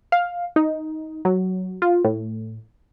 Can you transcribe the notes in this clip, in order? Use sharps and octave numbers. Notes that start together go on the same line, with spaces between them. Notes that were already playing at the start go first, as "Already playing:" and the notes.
F5
D#4
F#3
F4
A2